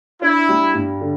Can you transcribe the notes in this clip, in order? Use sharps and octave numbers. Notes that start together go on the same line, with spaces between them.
D4 E4
G3
G2
D3